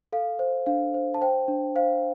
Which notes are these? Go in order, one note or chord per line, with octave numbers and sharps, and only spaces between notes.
A4 F5
C5
D4 F5
C5
A5
C5 G5
D4
C5 F5